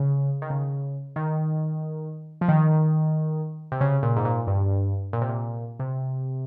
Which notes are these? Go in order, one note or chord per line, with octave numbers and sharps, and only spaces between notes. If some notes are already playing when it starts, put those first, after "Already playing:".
Already playing: C#3
D#3
C#3
D#3
F3
D#3
C3
C#3
A#2
G#2
A#2
G2
A#2
C3
A#2
C3